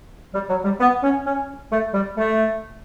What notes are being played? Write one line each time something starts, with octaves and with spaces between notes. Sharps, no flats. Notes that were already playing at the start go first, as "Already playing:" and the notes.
G3
F#3
G3
B3
C#4
C#4
A3
G3
A3